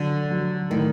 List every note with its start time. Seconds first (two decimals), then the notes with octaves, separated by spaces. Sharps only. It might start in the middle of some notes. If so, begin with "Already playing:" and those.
Already playing: D3 F#3
0.30 F#3
0.70 A2 D#3